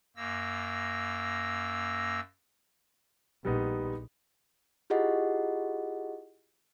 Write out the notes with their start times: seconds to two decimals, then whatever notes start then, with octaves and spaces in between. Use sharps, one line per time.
0.16 F#2 A#3 E6 A#6
3.45 A#1 G3 B3 D#4
4.90 E4 F4 G4 G#4 D#5 F#5